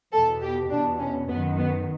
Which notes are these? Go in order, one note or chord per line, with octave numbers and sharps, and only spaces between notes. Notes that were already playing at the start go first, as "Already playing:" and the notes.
E2 B2 A4
G4
E2 B2 D4
C#4
F#2 D#3 B3
B3